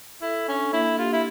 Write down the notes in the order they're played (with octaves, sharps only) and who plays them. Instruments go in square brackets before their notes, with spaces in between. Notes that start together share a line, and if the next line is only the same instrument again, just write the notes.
[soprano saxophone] E4 [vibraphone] A4
[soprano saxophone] C#4 [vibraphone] D4
[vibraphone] A#3 [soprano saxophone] E4
[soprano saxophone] F4 [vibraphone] G4
[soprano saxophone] E4